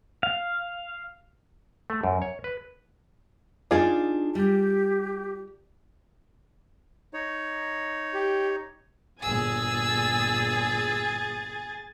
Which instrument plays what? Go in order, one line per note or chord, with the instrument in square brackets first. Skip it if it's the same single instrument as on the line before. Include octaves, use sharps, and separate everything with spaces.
[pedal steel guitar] F5
[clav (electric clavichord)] A3
F#2
C#5
B4
[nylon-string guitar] D4 D#4 D5 [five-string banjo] F4 G#4
[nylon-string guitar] G3 [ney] G4
[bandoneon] D#4 C#5
[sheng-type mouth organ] G4
[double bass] G1 A#2 [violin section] G#4 [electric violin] G#5 A6 [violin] E6